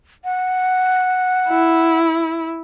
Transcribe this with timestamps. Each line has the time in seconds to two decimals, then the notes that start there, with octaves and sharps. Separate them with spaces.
0.24 F#5
1.49 E4